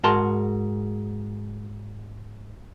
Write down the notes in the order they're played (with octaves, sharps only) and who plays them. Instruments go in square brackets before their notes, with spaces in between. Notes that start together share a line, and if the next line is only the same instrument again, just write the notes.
[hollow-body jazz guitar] G#2 F#4 G#4 A#4 A5 C6